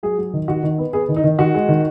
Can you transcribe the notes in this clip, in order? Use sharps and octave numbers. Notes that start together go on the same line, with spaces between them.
F#3 G#4
F#3
D#3
D#3 F#4
D#3
B3
B3 G#4
D#3
D#4
D#3
D#3 F#4
G#3
D#3